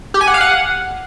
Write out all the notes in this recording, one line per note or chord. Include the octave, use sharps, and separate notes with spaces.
G4
G#5
F#5
F5
F#5